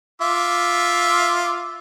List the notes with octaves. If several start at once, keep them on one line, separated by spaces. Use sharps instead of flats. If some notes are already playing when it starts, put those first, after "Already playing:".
F4 E5 D6